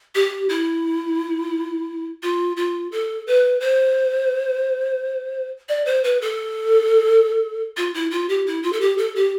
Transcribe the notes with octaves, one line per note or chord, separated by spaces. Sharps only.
G4
E4
F4
F4
A4
B4
C5
D5
C5
B4
A4
F4
E4
F4
G4
E4
F4
A4
G4
A4
G4